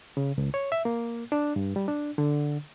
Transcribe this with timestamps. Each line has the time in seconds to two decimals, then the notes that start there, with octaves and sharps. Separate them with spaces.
0.17 C#3
0.38 C#2
0.54 C#5
0.72 E5
0.85 A#3
1.32 D4
1.56 G2
1.76 G3
1.88 D4
2.18 D3